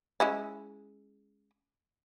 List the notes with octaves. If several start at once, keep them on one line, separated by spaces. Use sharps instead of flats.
G#3 C#4 E4